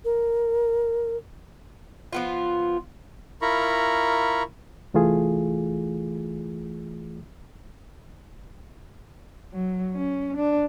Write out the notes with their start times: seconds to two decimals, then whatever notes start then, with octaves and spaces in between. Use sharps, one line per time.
0.05 A#4
2.13 F3 B3 F4
3.42 E4 F4 A#4 A#5 B5 C#6
4.94 C2 E3 A3 F4 G#4
9.53 F#3
9.95 C#4
10.37 D4